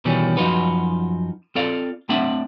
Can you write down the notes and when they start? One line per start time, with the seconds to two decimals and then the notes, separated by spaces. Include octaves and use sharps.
0.05 B2 D#3 E3 G3 C#4
0.37 F#2 F3 D#4 F4 F#4 B4
1.55 C4 F4 A4 D5 F5
2.09 A3 C4 D4 E5 F#5